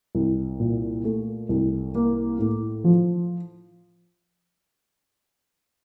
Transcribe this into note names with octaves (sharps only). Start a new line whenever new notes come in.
C2
A#2
A3
C2
A#3
A2
F3